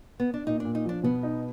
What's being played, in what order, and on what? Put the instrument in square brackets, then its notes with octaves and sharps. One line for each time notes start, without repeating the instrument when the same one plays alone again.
[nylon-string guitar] B3
D4
[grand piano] A#2 [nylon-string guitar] D#4
[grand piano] A#2 [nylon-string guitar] D4
[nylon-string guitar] D#4
[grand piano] F3 [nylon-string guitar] D4
[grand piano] B2 [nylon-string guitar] B3
[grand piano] D#4